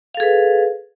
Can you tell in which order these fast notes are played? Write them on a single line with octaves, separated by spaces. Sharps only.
F5 A4 G#4 B4